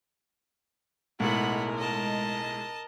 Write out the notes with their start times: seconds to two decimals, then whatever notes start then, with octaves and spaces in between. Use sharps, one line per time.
1.20 B1 A2 G#3 A#4 F#5 B5
1.78 D#5 A5